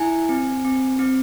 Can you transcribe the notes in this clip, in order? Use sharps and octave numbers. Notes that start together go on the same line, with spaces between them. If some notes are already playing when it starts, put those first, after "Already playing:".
Already playing: E4 G#5
C4
C4
C4